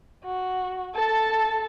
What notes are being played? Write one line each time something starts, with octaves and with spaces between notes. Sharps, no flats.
F#4
A4 A5